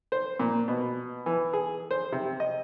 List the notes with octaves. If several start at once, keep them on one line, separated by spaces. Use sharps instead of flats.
C5
A#2
B2
E3
G#4
C5
C3
D#5